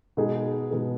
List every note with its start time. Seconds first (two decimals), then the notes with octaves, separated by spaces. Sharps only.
0.17 B2 G#3 B3 D#4 G#4
0.71 B2 G#3 B3 D#4 G#4